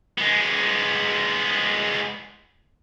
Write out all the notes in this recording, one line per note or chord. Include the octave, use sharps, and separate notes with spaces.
G#3 B3